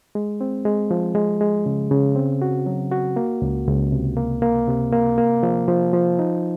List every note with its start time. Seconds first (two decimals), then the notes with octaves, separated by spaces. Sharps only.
0.15 G#3
0.41 C4
0.65 G#3
0.91 F3
1.15 G#3
1.41 G#3
1.66 C#3
1.91 C#3
2.16 C4
2.42 F#4
2.66 F#3
2.91 F#4
3.16 A#3
3.42 C#2
3.67 C#2
3.92 C3
4.17 A#3
4.42 A#3
4.68 C3
4.93 A#3
5.18 A#3
5.43 F3
5.68 F3
5.93 F3
6.19 D#4